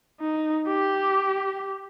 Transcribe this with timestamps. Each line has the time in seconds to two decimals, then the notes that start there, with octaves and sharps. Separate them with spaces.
0.21 D#4
0.67 G4